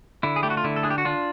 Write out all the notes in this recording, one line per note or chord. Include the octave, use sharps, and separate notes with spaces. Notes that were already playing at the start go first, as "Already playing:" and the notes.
D3 E4
G#4
A3 G4
F#4
F4
D3 E4
A4
D4 G#4
G4
F#4
D4 F4